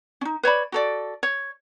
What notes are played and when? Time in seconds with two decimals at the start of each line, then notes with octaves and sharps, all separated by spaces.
0.21 C#4 D#4
0.43 B4 C#5 D5 B5
0.72 F#4 A4 D5
1.23 C#5